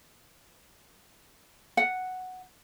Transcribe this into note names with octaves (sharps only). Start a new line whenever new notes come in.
F#5